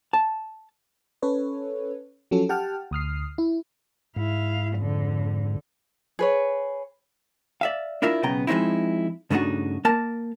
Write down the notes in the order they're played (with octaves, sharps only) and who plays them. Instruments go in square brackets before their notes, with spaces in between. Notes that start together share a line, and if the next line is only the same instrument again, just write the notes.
[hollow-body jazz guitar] A5
[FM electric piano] C#4 A4 B4 C#5
F3 F#3 C#4 F#4 A4
G4 F#5 G5 A5 F6
D2 D#6 F6 C7
E4
[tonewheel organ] G#2 [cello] E4 F5
[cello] F2 D3
[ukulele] G#4 B4 C#5
[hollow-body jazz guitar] D5 E5 F5
D4 E4 F4 A#4 E5
B1 C#3 B3 G5 A#5
F3 G#3 C4 D#4 E4
G2 C#3 A3 D4 D#4 F#4
A#3 A#4 A5